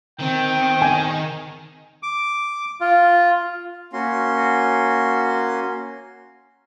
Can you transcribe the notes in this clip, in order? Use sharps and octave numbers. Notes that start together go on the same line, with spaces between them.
D#3 C4 G5
G#5
D6
F4
A#3 C#4 F#4 C6